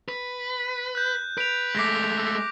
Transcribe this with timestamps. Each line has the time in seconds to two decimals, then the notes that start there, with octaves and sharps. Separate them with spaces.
0.09 B4
0.95 F#6 G6
1.38 B4 D7 F7
1.75 G#3 A3 D6 A#6 B6